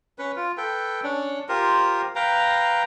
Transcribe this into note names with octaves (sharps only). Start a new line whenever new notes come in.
C#4 B4
F4
A4 B4 G5
C#4 D4
F4 G4 A#4 C5
B4 F5 G5 A#5